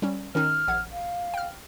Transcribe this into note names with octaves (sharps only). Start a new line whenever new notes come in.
G3 C#4
D#3 C#4 D#4 F6
A#1 F#5 G#6
F5
G5 F6